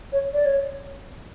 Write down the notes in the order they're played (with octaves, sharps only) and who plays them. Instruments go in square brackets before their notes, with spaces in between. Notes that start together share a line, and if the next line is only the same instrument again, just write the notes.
[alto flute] C#5
D5
C#5